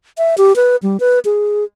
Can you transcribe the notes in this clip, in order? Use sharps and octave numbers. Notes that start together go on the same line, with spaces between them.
E5
G4
B4
G3
B4
G#4